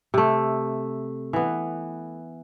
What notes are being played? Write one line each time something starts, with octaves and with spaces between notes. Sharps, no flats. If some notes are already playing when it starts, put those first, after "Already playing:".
C3 A3
E3 B3